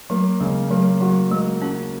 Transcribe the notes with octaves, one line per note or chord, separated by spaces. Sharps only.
F#3 A#3
C#3 G#3
F#3 A#3
F#3 F#4
G#3 A#3
C#4 F#4